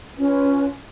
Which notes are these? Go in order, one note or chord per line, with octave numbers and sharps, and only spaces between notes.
C#4 F4 B4